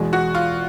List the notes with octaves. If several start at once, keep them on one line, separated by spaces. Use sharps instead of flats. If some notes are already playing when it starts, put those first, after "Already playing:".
Already playing: E2 B2 G#3
F#4
F4